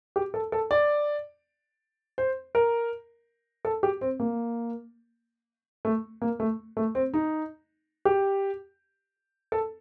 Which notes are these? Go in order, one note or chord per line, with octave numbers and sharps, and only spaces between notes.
G4
A4
A4
D5
C5
A#4
A4
G4
C4
A#3
A3
A#3
A3
A3
C4
D#4
G4
A4